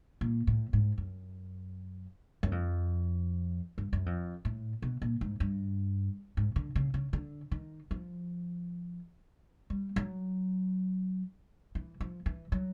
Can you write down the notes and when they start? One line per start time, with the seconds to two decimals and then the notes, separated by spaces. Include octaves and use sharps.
0.21 A#2
0.47 A2
0.73 G#2
0.98 F#2
2.43 F#2
2.52 F2
3.78 G2
3.93 F#2
4.06 F2
4.45 A2
4.82 B2
5.02 A#2
5.21 G#2
5.40 G2
6.37 G#2
6.56 D3
6.75 C#3
6.94 C#3
7.13 D3
7.51 D#3
7.91 F3
9.70 G3
9.96 F#3
11.75 E3
12.01 F3
12.26 E3
12.52 F#3